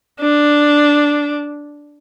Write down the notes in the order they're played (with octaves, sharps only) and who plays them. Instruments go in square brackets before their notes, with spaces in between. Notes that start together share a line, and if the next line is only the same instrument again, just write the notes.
[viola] D4